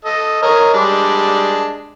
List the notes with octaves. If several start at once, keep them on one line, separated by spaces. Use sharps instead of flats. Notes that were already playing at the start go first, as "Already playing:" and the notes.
A4 D#5
A#4 C#5 D#5
G3 G#3 D4